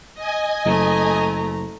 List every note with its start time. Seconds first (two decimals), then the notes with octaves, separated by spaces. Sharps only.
0.15 D#5 G#5
0.66 F#1 A3 A#5